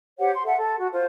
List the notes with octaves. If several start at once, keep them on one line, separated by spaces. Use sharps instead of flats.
G4 C5 C#5 F#5
C6
A4 E5 F#5
A4
F#4
F4 C5